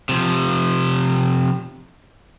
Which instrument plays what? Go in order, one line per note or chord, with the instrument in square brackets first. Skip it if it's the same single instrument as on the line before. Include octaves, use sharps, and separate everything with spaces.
[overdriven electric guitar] C3 F3